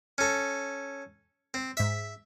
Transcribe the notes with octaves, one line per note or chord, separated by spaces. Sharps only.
C#4 A4
C4
G#2 E5 B6